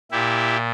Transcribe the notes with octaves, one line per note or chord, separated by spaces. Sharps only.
A#2 E4 G4